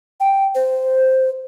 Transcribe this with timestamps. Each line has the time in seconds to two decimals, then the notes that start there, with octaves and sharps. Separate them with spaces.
0.20 G5
0.55 C5